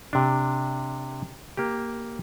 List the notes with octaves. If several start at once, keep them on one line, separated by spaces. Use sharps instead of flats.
C3 D4
A#3 G4